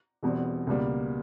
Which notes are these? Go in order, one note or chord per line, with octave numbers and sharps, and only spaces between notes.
E1 E2 B2 G3 C4
C#2 B2 G3 A#3